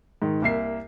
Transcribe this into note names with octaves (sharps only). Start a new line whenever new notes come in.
G#2 D#3
C2 A#3 E5 C7